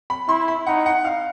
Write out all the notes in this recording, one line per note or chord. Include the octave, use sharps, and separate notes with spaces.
B5
E4 C6
B5
D#4 F#5
F#5
F5